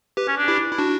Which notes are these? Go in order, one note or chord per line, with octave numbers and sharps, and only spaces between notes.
G4 B4
C#4
D4
E4 G4
E4
D4 F#4